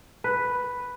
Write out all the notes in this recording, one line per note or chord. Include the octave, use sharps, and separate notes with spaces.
B4